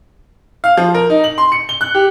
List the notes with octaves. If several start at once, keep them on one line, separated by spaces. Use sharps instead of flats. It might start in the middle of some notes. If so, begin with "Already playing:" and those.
F5
F3
A#4
D#4
F#7
C6
C#7
G7
F#6
G4